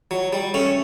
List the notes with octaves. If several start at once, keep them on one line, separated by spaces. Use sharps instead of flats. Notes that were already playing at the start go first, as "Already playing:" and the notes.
F#3
G3
A3 C#4